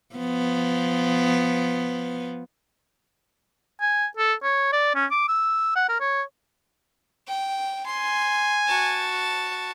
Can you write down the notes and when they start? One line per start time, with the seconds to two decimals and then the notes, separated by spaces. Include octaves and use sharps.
0.15 F3 B3
3.81 G#5
4.17 A4
4.43 C#5
4.73 D5
4.95 C#4
5.11 D6
5.28 E6
5.76 F#5
5.89 A#4
6.00 C#5
7.28 G5
7.86 G#5 C6
8.67 F#4 A5